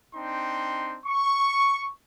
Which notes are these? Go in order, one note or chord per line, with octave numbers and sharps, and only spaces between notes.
C4 D4 D#4 G5 C6
C#6